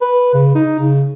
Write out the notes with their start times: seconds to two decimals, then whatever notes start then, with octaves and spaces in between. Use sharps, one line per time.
0.01 B4
0.34 C#3
0.55 D#4
0.79 C#3